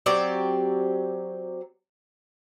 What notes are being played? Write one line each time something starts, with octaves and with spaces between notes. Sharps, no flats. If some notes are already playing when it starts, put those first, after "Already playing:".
F#3 C4 G4 D5